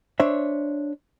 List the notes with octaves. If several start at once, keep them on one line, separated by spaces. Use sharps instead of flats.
D4 C5 C#5 E5